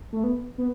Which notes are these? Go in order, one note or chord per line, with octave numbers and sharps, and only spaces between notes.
A3
B3
B3